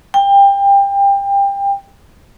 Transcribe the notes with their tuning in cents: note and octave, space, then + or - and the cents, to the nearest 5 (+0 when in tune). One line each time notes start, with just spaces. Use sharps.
G5 +25